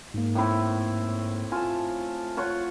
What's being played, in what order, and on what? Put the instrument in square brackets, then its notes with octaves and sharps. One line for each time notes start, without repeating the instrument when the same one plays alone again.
[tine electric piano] G#2 A#3
[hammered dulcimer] A2 C4 E4
[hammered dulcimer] F4 A5 [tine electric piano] G#5
[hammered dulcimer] F4 C#5 F#5